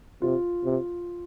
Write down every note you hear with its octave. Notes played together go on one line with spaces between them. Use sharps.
C3 F4
C3